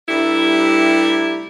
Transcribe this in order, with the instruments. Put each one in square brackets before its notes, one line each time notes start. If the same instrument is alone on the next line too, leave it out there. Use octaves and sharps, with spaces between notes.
[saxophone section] G2 C3 G3 A3 E4